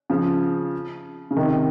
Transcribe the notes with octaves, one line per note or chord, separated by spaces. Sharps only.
C#3 F3
C#3
C3 D#3